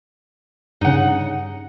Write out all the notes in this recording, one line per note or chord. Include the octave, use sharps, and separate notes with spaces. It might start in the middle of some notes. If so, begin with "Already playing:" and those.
G2 C#3 D#4 F#5